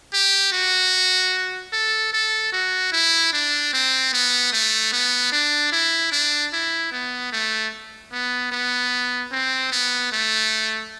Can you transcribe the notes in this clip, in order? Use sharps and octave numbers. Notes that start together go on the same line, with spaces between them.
G4
F#4
A4
A4
F#4
E4
D4
C4
B3
A3
B3
D4
E4
D4
E4
B3
A3
B3
B3
C4
B3
A3